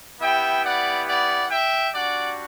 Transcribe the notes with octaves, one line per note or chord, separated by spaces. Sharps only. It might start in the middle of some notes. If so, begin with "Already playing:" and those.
B3 E4 G4 E5 G5
D5 F#5
D5 F#5
E5 G5
G3 D4 F#4 D5 F#5